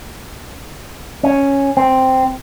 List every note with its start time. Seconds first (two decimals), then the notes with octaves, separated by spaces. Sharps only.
1.23 C#4
1.77 C4